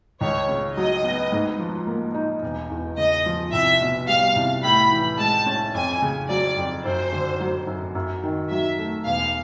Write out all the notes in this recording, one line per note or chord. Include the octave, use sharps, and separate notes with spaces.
C#2 C#5
C#3
F#3 D#5
B3
G#2
F3
A#3
D#4
E1
E2
C#3 D#5
F3
C2 E5
B2
G3 F5
C2
A2 B5
E3
G#3 A5
C#4
F2 G#5
C#3
F#3 D5
F2
F#2 C5
D3
F#3
F#2
F#2
D#3
F#3 E5
A3
E1 F5